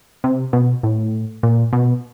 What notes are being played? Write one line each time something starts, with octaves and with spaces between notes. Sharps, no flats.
C3
B2
A2
A#2
B2